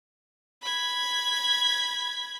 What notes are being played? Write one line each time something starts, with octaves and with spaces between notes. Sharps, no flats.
B5 G#6